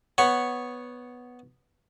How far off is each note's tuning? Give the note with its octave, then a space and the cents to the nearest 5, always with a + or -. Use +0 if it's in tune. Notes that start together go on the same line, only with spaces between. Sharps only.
B3 +0 C#5 +0 F#5 +0